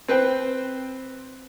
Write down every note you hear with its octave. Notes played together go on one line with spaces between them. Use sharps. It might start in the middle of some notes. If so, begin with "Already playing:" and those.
C4 B4 C5 G5